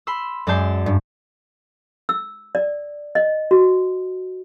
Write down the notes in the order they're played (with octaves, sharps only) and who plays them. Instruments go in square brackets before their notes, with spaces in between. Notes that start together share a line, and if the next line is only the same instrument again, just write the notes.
[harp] B5 C6 E6
F#2 G#3 D5 A5 G6 C7
G2
[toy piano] E6
D5
D#5
F#4